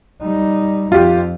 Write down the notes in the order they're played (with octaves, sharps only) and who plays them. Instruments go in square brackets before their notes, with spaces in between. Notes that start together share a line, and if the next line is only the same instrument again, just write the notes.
[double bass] G3 D#4
[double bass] F2 [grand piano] F4 G4